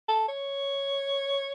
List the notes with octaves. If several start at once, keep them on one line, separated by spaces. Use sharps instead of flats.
A4
C#5